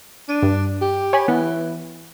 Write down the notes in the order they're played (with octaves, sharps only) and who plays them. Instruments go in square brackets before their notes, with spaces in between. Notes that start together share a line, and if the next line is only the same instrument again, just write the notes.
[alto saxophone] D4 [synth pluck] D#7
[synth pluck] G2
[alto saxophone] G4
[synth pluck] C#5 G#5 B5
[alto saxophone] E3 [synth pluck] B3